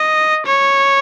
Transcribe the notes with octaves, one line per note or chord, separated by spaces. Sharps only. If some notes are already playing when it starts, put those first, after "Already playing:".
Already playing: D#5
C#5